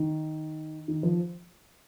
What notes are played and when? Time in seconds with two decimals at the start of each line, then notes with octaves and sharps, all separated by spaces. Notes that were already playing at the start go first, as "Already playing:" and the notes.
Already playing: D#3
0.88 D#3
1.03 F3